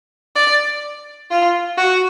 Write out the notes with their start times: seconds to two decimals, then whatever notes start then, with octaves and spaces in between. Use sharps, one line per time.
0.35 D5
1.30 F4
1.78 F#4